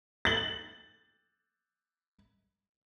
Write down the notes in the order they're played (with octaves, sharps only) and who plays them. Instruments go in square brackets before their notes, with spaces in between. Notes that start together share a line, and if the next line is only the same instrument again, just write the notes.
[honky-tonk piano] A6 F#7